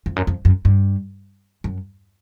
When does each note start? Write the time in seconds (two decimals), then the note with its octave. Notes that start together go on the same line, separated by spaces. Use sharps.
0.06 F2
0.16 F#2
0.27 F2
0.45 F#2
0.65 G2
1.64 F#2